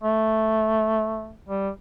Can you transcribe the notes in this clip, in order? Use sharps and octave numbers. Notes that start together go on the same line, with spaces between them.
A3
G3